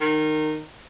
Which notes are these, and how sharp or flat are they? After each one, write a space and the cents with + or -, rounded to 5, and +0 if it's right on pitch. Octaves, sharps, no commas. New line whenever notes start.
D#3 -15